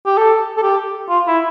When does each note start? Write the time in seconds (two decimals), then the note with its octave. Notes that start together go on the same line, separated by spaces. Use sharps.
0.06 G4
0.17 A4
0.57 A4
0.63 G4
1.09 F4
1.28 E4